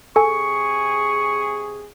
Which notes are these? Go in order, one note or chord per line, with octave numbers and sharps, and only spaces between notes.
C3 G#4 A4 G#5 C#6